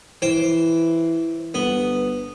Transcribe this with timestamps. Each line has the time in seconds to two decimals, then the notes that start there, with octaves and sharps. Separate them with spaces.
0.22 E3 C5 G5
1.54 G1 B3